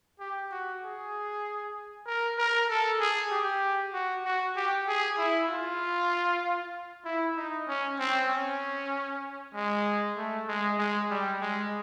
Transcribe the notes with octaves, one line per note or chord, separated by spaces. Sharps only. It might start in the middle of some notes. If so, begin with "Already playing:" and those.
G4
F#4
G#4
A#4
A#4
A4
G#4
G4
F#4
F#4
G4
G#4
E4
F4
E4
D#4
C#4
C4
C#4
G#3
A3
G#3
G#3
G3
G#3